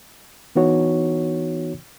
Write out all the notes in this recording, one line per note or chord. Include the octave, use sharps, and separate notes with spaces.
E3 B3 D#4 F#4 C#5